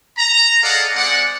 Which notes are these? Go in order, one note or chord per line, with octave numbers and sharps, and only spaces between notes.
A#5
G#4 A4 D5 D#5 F5 F#5
G#3 C4 D5 F#5